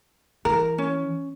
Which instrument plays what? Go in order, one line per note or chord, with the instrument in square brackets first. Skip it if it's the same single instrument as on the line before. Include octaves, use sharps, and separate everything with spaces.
[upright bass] E3 [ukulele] A#4
[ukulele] C#4